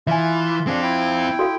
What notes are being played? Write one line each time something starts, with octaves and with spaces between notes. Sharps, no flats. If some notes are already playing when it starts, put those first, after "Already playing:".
E3 F4 E5 G#5
C4 D4 F4 G#4
E4 G5
F#4 A4 F5